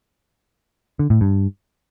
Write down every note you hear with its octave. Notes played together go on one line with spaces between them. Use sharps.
D3
A2
G2